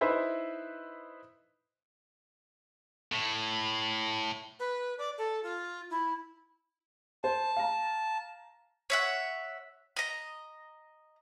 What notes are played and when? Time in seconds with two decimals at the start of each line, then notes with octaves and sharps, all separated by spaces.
0.01 D#4 E4 B4 C5 E5
3.12 A2
4.59 B4
4.98 D5
5.18 A4
5.43 F4
5.90 E4
7.24 C5 A5
7.57 F5 A#5
8.90 C#5 E5 F#5
9.96 D#5 A#5